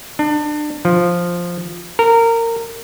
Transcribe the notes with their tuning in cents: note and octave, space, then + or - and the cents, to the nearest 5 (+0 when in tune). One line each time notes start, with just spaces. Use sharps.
D4 +30
F3 +0
A#4 -20